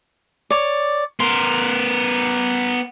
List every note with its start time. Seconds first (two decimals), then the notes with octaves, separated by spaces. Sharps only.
0.50 C#5 D5
1.20 B3 A#4 C6